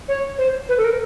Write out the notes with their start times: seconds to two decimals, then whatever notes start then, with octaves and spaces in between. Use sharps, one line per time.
0.08 C#5
0.38 C5
0.69 B4
0.78 A4
0.84 A#4